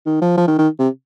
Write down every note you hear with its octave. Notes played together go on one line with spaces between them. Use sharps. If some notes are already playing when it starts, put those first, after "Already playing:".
D#3
F3
F3
D#3
D#3
C3